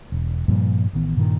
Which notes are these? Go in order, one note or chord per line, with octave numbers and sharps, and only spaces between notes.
E1
G2 A#2 F3 G3
A1 D#3 B3
G2 A#2 D#3